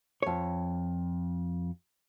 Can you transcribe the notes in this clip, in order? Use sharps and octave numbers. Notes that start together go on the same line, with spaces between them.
F2 C#5